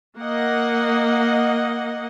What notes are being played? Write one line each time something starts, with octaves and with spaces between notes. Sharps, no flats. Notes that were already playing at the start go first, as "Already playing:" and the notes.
A#3 D#5 F#5